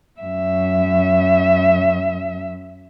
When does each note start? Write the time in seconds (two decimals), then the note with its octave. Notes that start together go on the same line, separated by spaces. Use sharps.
0.21 F#2 E5